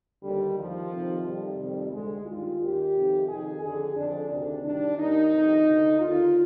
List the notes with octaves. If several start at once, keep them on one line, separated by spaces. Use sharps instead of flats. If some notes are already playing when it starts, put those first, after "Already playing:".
D#2 D3 G3
D#2 D#3 F3
F2 C3 D#3
F2 C3 D#3 G3
F2 C3 D#3
D2 D3 G#3
G2 D#3 F4
D#2 D#3 G4
F2 C3 D#3
F2 D#3 G#4
F2 D3 G#4
F2 D3 D4
D2 C3 D#3 D4
G2 D#3 D4
D#2 D#3 D#4
F2 C3 D#3
D2 D3
D#2 D3 F4